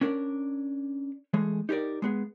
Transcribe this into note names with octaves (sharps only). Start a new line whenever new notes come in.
C#4 D4 A#4 D5
E3 G#3 A3 G#4
D#4 G4 G#4 A#4 D5
G#3 B3 G#4